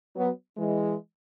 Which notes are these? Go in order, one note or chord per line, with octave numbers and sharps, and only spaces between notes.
F#3 B3
E3 G#3